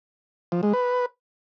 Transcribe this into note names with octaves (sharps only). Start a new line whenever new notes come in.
F3
G#3
B4